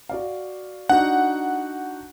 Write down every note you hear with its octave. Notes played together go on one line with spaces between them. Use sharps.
F#4 D5 F5
D4 D#4 F#4 F#5